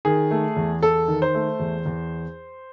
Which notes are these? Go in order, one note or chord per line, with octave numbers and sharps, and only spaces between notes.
D#3 G#4
A3
E2
E2 A4
D#3
C5
A3
E2
E2